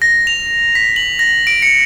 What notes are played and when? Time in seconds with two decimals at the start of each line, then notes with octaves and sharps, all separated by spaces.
0.02 A#6
0.27 F7
0.75 B6
0.96 F#7
1.19 A#6
1.47 D7
1.62 C#7